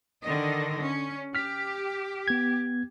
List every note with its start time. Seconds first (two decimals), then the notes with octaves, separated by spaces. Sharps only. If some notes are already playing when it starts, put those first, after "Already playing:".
0.23 D3 D#3 D#5
0.80 C#4
1.35 G4 F6 B6
2.28 B3 G#6